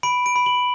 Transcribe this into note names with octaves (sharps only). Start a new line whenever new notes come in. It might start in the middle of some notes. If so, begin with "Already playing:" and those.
B5 D7
D7
B5
F#7